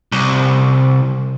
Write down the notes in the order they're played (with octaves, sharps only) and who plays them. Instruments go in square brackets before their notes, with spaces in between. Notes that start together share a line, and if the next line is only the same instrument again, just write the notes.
[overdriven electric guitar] C2